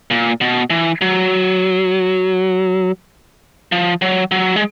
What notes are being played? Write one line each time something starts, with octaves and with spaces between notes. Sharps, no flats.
A#2
B2
E3
F#3
F3
F#3
F#3
G#3